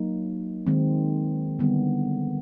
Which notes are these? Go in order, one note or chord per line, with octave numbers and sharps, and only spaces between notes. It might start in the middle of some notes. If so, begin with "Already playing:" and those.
Already playing: F#3 A#3 D#4
D#3 G#3 C4
D3 G3 B3